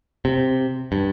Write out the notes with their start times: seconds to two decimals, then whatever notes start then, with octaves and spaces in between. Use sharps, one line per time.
0.25 C3
0.92 G2